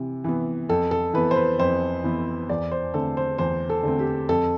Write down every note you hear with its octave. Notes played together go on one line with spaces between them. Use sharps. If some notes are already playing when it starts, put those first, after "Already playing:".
Already playing: C3 E3
E3 B3
F2 A4
A4
E3 B3 B4
C5
B4
F2 C5
E3 B3
E2 D5
C5
D3 A3 C4 A4
C5
E2 C5
A4
D3 A3 C4
G4
F2 A4